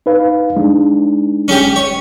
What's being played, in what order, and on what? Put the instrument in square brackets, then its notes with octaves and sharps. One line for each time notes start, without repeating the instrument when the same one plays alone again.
[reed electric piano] D#4 B4 F5
G#3 D4 D#4
[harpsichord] C#4 G4
C#5